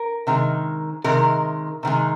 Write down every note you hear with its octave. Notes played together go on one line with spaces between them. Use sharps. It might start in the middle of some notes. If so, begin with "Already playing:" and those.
Already playing: A#4
C3 D#3 G#3
C3 D#3 G#3 A#4
C3 D#3 G#3